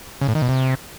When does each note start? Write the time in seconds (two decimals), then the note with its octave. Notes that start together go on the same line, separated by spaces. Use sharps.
0.21 C#3
0.28 A2
0.35 D#3
0.42 B2
0.49 C3